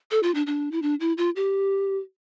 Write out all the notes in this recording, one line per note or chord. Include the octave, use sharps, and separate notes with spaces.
A4
F4
D4
D4
E4
D4
E4
F4
G4